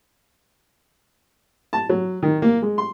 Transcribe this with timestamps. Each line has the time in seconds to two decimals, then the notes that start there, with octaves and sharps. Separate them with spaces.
1.73 A5
1.89 F#3
2.23 D#3
2.42 A#3
2.62 G#3
2.78 C6